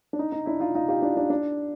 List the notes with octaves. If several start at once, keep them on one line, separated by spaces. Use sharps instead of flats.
D4
D#4
D#4
D4 E4
D#4 F4
D#4 F4
F4 G4
D4 E4
D4
D4